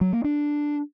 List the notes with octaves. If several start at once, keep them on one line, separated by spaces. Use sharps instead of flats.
F#3
A#3
D4